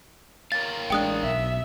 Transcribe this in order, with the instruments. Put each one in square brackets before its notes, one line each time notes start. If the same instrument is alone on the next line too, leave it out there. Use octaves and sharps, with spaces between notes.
[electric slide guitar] A#4 C#5 F5 [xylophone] A6
[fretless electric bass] A1 G#3 D4 [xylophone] G5 D#6 F#6
[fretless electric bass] B1 [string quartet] E5